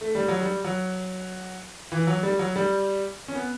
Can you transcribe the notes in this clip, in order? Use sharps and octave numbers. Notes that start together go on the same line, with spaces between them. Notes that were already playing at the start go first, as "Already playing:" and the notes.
A3
G3
F#3
G3
F#3
E3
F#3
G3
F#3
G3
C#4
B3